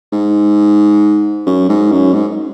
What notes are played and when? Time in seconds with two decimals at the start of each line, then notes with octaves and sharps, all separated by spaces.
0.12 G#2
1.46 F#2
1.69 G#2
1.91 F#2
2.13 G#2